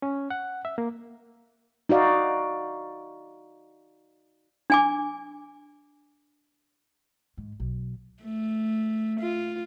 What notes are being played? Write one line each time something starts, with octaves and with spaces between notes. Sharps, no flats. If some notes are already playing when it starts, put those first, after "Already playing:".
C#4
F#5
E5
A#3
D#4 F#4 D5 F5
D4 G#5 D6
G#2
B1
A3
F4